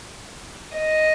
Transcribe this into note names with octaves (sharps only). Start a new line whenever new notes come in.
D#5